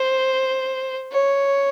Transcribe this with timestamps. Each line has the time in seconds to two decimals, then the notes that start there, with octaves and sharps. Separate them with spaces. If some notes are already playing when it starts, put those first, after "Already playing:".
Already playing: C5
1.13 C#5